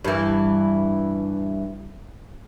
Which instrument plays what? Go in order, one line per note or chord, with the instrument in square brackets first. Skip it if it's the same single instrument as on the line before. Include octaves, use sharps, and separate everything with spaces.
[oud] G2 E3